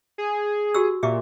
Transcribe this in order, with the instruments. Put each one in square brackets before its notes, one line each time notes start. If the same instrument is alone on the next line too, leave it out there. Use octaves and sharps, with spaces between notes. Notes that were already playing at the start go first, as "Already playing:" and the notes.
[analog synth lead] G#4
[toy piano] F#4 G4 E6
[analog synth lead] A#2 [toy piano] G4 E5 D6